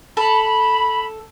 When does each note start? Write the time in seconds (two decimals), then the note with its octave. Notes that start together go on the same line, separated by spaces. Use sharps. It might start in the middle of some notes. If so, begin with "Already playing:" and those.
0.17 A4 B5